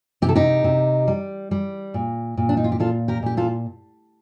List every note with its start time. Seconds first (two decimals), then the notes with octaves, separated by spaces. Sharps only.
0.22 C3 G4
0.29 A4
0.36 D#4 G4
0.64 C3
1.07 G3
1.51 G3
1.94 A#2
2.37 A#2
2.49 D4
2.57 D#4
2.64 F4
2.72 G4
2.80 A#2 F4 A4
3.08 G4 A#4
3.23 A#2 G4
3.37 F4 A4